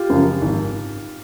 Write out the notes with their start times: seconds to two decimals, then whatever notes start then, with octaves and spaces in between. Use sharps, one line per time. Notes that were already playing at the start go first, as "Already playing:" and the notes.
Already playing: F4 G4
0.10 F#2 C#3 F3
0.41 G#1